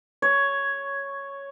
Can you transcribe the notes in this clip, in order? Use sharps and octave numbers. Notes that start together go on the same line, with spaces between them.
C#5